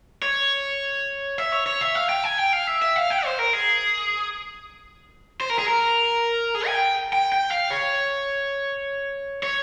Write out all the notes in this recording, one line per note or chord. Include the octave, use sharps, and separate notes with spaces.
C#5
E5
C#5
C#5
E5
F5
G5
G#5
G5
F5
E5
E5
F5
G5
C5
A#4
G#4
C5
A#4
G#4
A#4
G#4
G#5
G5
G5
G5
F5
C#5
C#5